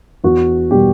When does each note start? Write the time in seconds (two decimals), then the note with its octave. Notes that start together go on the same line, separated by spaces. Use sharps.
0.24 E2 F#4
0.71 B2 G3 G4